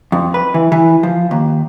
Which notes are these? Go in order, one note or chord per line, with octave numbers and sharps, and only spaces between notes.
F2
B4
E3
E3
F3
D#2